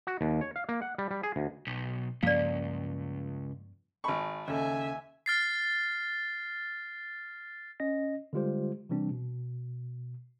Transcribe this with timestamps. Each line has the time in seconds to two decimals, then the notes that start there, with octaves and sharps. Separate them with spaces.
0.07 F#4
0.21 D#2
0.41 C#5
0.56 F5
0.69 A#3
0.82 F#5
0.98 G3
1.11 G3
1.23 G#4
1.36 D2
1.67 B1
2.23 C#2 G2 F3 A#3 D5 F5
4.04 G#1 A5 B5 C#6
4.48 D#2 C#3 A4 E5 G#5
5.26 F6 A6 C7
7.80 C#4 D#5 A#6
8.33 D3 G3 G#3 F4 G4 C5
8.89 C3 E3 G3 C4 D4
9.11 B2